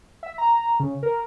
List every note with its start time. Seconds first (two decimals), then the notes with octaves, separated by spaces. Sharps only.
0.23 E5
0.38 A#5
0.80 C#3
1.03 A#4